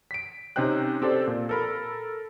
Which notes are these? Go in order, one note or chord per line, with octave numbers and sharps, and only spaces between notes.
B6 D7
C3 C#4 D#4 C5 G5 F#6
C4 G4 A4 C5 D5
A#2
A4 A#4 B5